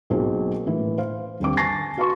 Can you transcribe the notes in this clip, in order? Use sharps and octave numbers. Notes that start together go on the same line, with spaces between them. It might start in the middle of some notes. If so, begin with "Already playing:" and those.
B1 F#3 A#3 C4 G#4 C5
A2 E3
C5 F5
D#1 D3 C4 D6
G#5 A5 C#6 A6 A#6 C7
F#4 F5 A5 C6 C#6